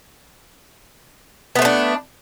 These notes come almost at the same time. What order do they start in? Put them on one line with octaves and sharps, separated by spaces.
B3 A3 C5 D4